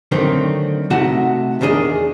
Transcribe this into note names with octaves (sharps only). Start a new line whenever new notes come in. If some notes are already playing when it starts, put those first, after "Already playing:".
D3 D#3 F#3 A3 C4
C3 A3 D#4 F#4 F#5 A5
E2 D#3 D4 G#4 D#5